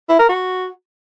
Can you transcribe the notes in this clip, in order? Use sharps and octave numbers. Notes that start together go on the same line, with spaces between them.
E4
A#4
F#4